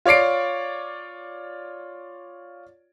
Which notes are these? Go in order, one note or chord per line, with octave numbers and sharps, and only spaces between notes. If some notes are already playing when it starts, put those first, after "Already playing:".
F4 C#5 D5 C7 D7